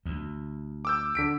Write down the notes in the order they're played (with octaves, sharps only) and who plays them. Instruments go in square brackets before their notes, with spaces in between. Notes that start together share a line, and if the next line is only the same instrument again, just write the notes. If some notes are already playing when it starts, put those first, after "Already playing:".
[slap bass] D2
[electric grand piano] D6 E6 G6
D3 B6 D7